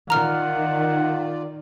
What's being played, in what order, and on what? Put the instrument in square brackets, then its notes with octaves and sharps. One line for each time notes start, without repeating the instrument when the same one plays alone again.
[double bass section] D#3 [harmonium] F4 D5 [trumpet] F#5 [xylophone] A#5 F6